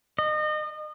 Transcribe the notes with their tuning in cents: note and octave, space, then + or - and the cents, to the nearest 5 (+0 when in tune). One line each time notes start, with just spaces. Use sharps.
D#5 -30